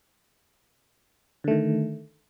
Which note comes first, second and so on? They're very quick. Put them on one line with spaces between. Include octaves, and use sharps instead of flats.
D3 A3 D#3